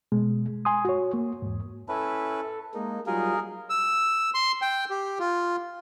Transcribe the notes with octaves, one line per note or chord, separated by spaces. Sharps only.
B2 G#3
G#5 C6 D#6
F#4 C#5
A#3
E2 G#2
C#4 E4 A4 B4
G#3 A#3 D#4
F#3 G3 D#4 F4 G#4 A#4
E6
C6
G5
G4
F4